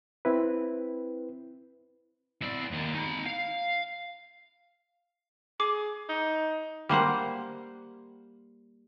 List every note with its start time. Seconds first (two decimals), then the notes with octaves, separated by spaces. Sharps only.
0.25 C4 E4 B4
2.42 E4 D5
2.71 D#2
2.95 D#4 B5
3.27 F5
5.60 G#4 D6
6.09 D#4
6.89 G3 A#3 C5 F#5